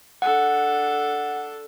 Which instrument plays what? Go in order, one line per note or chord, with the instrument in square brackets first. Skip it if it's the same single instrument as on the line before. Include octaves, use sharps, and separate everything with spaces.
[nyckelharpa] D4 A4 [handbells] F#5